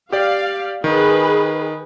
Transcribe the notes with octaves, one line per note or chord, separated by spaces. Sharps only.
G4 D5 F5
D#3 G#4 B4